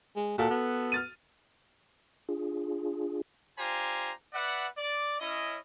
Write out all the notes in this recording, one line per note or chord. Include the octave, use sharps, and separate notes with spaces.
G#3
A#2 F#4 A4 A5
B3
F6 A6 D#7
D4 F4 G#4
D4 F4 G4 C5 G#5 A#5
B4 D5 E5 F#5
D5
C#4 E4 D#5